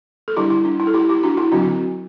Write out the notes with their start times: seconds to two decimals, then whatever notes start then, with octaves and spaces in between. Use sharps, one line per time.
0.28 A4
0.36 D3 G3 D4 E4 G4
0.50 E4
0.65 D4
0.80 E4
0.87 A4
0.94 E4 G4
1.09 E4 G4
1.23 D4 F#4
1.37 E4
1.52 D3 F#3 C4 D4 F#4